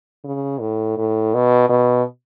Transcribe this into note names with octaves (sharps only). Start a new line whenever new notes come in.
C#3
A2
A2
B2
B2